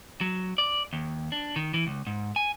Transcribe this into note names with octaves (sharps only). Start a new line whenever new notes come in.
F#3
D5
D#2
D4
D#3
E3
C#2
G#2
G#5